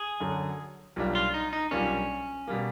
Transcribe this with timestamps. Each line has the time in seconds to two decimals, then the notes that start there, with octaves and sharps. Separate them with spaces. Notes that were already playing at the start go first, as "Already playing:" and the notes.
Already playing: G#4
0.20 F#2 D3 F#3
0.96 B1 A#2 G3 A#3 D4
1.15 F4
1.34 D#4
1.53 D#4
1.71 B1 A#2 G3 A#3 C#4 D4
2.48 B2 G3 A#3